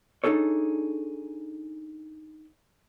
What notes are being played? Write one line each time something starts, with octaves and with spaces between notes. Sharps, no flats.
D4 D#4 G#4 A4 C#5